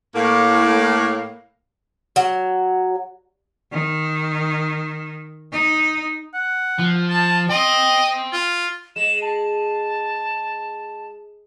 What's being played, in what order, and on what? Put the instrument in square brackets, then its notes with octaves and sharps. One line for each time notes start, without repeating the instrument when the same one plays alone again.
[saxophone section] A2 A#3
[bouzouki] F#3
[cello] D#3
D#4
[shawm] F#5
[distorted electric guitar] F3
[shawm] A5
[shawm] D#5 [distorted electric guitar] G5 C6
[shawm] F4
[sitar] G#3 [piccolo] E7
[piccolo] A5